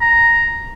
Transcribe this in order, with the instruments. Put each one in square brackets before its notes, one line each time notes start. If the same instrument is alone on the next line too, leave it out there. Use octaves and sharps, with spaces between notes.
[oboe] A#5